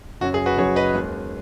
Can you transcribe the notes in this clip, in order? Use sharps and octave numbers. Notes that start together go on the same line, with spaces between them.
F#1 F#2 F#3 C#4 F#4
G#4
F#4 B4
F#1 F#2 F#3 C#4 G#4 C#5
B4 D#5
D#2 D#3 G#3